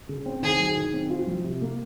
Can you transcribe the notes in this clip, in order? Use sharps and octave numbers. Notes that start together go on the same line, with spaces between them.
C#3
C4
D#3 G#4
F#3
D#3
C4
F4
F3
C3
A#3